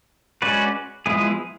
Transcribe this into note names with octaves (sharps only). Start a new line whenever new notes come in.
G#3 C#4 F#4 B4 D5
F3 G#3 B3 E4 G#4